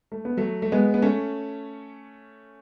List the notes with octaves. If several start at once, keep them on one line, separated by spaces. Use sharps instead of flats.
A3
B3
F#3 A3
A3
G#3 B3
B3
A3 C#4